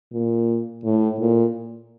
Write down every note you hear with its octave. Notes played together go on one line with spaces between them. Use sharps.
A#2
A2
A#2